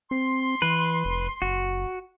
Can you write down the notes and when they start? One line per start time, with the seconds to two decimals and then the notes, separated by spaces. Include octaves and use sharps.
0.11 C4 C6
0.62 E3 B4
1.05 F1
1.42 F#1 F#4